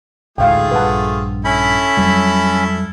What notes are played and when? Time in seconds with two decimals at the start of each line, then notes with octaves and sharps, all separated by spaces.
0.38 A1 D2 G#2 A3 F4 G#4 F5 G5
0.71 A#1 G2 B4 F#5 A5
1.45 C#4 E4 A4 B5
1.97 F2 F#3 G3